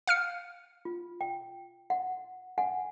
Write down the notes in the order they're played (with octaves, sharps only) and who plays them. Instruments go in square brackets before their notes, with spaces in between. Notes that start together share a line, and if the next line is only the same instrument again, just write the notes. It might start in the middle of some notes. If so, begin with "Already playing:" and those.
[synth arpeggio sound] F5 F6 C#7
[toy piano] F4
G5
F#5
F#5 G#5